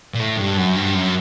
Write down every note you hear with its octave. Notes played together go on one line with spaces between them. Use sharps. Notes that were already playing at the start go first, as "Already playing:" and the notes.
A#2
A2
G2
F#2
G2
F#2